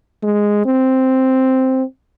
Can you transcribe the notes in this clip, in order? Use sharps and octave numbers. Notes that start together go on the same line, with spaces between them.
G#3
C4